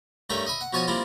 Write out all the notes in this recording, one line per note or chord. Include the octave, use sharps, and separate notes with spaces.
G2 A3 C#4 A#4 E5 G5
D#5 E5 B5
F#5
B2 F3 F#4 C#5 G#5 A5
G3 A#3 C4 D4 E4 F4